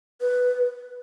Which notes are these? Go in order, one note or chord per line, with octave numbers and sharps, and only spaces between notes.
B4